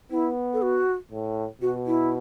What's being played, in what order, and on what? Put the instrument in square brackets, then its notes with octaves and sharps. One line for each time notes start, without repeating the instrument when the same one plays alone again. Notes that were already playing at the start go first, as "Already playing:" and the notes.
[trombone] B3 [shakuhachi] E4
[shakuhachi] A4
F#4
[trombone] A2
[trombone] B2 [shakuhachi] F#4
[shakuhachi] E4